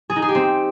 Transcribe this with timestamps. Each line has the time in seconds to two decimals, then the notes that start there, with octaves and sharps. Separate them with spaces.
0.10 G#4
0.16 D#4
0.22 G#4
0.29 G4
0.35 C4